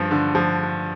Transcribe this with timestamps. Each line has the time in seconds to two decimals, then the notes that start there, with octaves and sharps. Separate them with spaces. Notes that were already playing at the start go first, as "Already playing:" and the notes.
Already playing: G2 F3
0.11 D3
0.35 F3